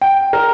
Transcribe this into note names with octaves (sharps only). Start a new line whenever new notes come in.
G5
A#4